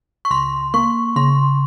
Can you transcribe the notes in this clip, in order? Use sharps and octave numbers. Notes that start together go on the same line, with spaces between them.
C#6
C#2 C6
A#3 C#6
C#3 C6